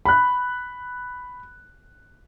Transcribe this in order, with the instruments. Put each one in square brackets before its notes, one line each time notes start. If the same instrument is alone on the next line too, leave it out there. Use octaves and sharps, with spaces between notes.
[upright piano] B5 F#6